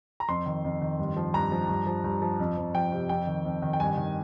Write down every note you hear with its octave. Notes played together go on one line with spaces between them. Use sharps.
A#5
F2 C6
D#3
F2
D#3
G2
F3
G2 A#5
F3
G2
F3
G2
F3
F2
F2
F3 G5
C3
F2 G5
D#3
F2
D#3
G5
G2 G#5
D#3